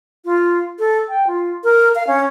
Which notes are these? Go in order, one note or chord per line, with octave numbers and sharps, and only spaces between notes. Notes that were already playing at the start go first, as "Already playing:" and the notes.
F4
A4
G5
F4
A#4
F5
C#4